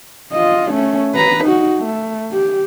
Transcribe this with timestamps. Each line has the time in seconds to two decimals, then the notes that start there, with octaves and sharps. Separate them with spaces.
0.33 F4 D#5
0.72 A3 C#4
1.15 B4 A#5
1.44 D#4 F#4
1.79 A3
2.32 G4